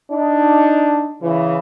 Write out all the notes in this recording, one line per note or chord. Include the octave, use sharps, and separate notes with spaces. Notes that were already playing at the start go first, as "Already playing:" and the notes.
D4 D#4
C#3 E3